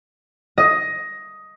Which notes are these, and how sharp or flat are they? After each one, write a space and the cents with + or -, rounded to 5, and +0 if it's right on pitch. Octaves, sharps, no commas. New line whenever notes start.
D#5 +10